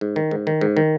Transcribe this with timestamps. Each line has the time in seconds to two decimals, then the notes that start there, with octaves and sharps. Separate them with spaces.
0.01 G#2
0.16 D#3
0.31 G#2
0.47 D#3
0.61 G#2
0.77 D#3